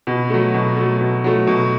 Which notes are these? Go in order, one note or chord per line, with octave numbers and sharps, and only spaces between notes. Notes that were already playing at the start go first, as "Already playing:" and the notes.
B2
F#3 A3
B2
F#3 A3
B2
F#3 A3
B2